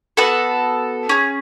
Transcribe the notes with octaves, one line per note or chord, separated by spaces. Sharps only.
B3 F#4 A4 F#5
C#4 G#4